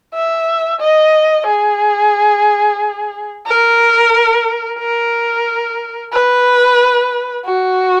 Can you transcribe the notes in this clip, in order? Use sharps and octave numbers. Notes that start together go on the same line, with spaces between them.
E5
D#5
G#4
A#4
A#4
B4
F#4